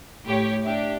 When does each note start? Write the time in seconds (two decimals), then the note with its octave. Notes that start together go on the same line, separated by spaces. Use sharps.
0.24 A2 G4 C#5
0.63 D4 G4 E5